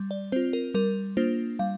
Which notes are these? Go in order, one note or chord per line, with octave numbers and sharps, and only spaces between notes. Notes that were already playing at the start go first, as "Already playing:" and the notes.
Already playing: G3
D5
C4 F4 C5
A#4
G3 A#4
A#3 D4 F4 C5
G3 F5